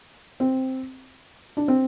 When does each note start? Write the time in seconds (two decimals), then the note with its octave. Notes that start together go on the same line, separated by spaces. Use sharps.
0.40 C4
1.57 D4
1.68 C4